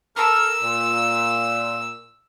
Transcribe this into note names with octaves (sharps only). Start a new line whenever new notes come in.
A4 A#4 E6
A#2